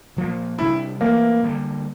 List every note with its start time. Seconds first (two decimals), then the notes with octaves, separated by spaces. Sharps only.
0.16 A#2 F3 A#3
0.58 C3 G3 D4 E4
1.01 E3 A3 A#3 C4
1.43 D3 G3 A#3